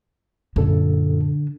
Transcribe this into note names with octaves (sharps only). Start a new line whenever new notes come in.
F#2 A#2 D3 A4